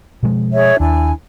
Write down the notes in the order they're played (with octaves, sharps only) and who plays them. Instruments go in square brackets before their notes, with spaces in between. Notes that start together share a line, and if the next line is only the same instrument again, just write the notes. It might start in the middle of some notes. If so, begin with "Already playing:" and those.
[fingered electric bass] B2 F3 G#3
[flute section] G#4 C#5 E5
[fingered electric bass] D#2 [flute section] D4 E4 G#5